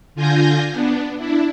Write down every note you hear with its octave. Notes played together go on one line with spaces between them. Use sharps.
D3 F4 G#5 G6 A#6
B3 D4
D4 E4